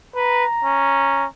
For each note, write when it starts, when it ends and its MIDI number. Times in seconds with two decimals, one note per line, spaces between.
0.15 0.45 71
0.15 1.28 82
0.64 1.25 61